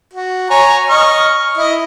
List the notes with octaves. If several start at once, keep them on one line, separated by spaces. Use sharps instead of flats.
F#4
C#5 G#5 A#5
D#5 C#6 F6
E4 D#5